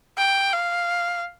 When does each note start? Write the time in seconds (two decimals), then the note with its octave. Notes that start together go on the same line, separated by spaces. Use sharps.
0.18 G5
0.52 F5